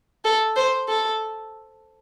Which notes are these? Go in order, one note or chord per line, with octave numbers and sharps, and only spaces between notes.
A4
C5
A4